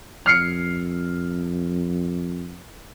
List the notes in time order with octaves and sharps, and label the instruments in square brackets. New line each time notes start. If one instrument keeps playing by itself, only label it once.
[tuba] F2 [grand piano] F6 C7 C#7